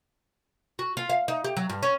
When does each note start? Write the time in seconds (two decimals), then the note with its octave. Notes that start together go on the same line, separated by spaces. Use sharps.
0.79 F#4
0.97 F4
1.10 F5
1.28 D#4
1.44 G4
1.57 F#3
1.69 G2
1.83 C#4